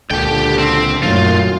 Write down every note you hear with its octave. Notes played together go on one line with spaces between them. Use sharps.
C#2 A#2 D3 G4 G5
C4
F#2 A#2 D#3 A3 F4